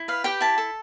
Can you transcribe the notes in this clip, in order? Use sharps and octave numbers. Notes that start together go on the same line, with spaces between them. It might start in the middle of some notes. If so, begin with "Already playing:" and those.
Already playing: E4
B4 F5
G4 G5
E4 A5
A4